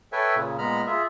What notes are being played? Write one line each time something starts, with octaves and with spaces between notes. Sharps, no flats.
A4 B4 C#5 E5 G5 G#5
A#2 C#3
A#2 G#3 B3 A#5 B5 F6
F4 G#4 E5